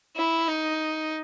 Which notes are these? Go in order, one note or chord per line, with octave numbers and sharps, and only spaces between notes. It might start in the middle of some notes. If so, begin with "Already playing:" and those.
E4
D#4